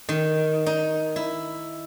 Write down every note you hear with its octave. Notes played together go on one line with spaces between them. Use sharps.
D#3
D#4
E4